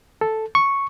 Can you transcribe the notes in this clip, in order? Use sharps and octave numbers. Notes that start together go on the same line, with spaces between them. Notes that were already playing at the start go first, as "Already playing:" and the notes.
A4
C#6